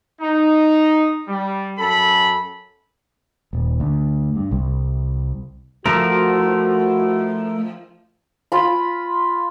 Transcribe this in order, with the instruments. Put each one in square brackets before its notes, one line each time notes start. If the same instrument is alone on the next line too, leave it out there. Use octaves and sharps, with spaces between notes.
[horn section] D#4
G3
F#2 A4 B5
[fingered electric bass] D#1
D2
G2
C2
[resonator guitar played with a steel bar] F3 [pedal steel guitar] A3 A#4 [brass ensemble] E4 F#4
[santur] F4 B5